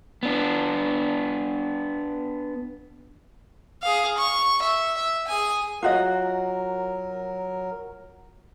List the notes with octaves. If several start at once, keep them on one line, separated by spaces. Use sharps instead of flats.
B3 D4
G#4 F5
C#6
E5
E5
G#4 G#5
F#3 F4 F#4 A#4 D#5